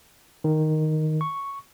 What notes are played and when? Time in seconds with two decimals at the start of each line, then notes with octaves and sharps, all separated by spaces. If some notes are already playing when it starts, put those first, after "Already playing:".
0.44 D#3
1.21 C#6